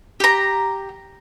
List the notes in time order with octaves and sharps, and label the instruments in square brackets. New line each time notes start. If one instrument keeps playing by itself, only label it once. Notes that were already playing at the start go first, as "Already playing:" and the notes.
[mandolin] G4 A#5